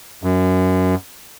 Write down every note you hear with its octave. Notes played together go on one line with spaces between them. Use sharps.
F#2